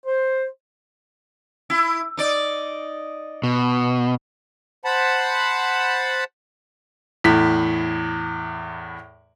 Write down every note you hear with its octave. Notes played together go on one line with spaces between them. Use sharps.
C5
E4
D#4 D5
B2
C5 F#5 A5 B5
E2 A2 B6